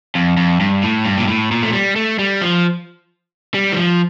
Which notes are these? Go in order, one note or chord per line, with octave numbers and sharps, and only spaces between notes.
F2
F2
G2
A2
G2
A#2
A2
A#2
A3
G3
A3
G3
F3
G3
E3
F3